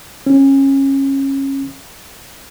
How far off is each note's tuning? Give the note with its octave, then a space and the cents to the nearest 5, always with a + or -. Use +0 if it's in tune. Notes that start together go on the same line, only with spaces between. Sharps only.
C#4 -25